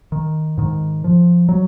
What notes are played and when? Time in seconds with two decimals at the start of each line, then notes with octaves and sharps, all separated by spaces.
0.12 D#3
0.58 G#2 D#3
1.04 F3
1.49 F#3